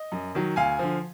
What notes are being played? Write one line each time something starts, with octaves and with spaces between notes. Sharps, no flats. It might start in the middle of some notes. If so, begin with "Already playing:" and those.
Already playing: D#5
F#2
D#3 F#3
D2 F5 G#5
D3 F3